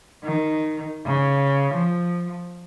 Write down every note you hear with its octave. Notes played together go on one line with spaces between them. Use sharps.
D#3
C#3
F3